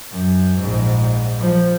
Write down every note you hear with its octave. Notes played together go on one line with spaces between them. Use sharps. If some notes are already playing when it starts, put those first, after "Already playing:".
F#2
A#1 G#2
F3